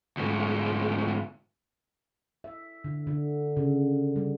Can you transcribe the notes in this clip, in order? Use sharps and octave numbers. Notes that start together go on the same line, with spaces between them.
D2 G#2
E5
D3
D3
C#3
G3